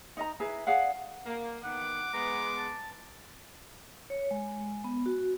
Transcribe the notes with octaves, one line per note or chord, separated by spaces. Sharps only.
D#4 D#5 A#5
E4 G#4 B4 A#5
G#4 D5 F5 F#5
A#3
D#3 B3 F#5 D6
G#3 B3 A#5
A5
C#5
G#3
B3
F#4